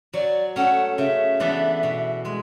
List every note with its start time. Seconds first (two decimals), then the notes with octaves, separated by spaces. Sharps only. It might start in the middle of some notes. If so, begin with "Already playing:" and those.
0.14 F#3 D5
0.56 A3 C#4 F#5
0.98 C#3 E5
1.40 E3 B3 D4 A4
1.83 B2
2.25 G#3